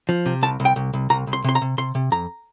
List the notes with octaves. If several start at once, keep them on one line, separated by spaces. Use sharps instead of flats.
F3
C3
C2 A5
C2
G5
C2
C2
C2 A#5
C2
C6
C3 C6
A#5
C3
C3 C6
C3
F2 A#5